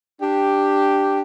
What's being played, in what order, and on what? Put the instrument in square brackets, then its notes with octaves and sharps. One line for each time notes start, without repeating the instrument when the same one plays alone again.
[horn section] D4 G4